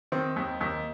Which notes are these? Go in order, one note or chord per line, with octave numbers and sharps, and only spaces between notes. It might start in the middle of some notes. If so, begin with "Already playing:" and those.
D#3 C4
D#2
D#2